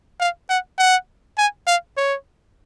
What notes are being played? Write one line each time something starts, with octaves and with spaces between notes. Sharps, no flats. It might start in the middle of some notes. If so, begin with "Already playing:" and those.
F5
F#5
F#5
G#5
F5
C#5